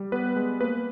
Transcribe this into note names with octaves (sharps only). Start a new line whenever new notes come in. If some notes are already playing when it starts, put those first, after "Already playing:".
Already playing: G3
B3 B4
G#3
A#3 B4